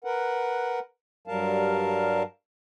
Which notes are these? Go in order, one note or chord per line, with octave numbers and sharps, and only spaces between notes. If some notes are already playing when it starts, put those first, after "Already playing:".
A#4 B4 F#5
G2 F#3 G3 A#4 F5 A5